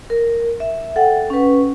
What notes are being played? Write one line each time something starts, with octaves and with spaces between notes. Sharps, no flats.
A#4
E5
A4 F#5 G5
C#4 B4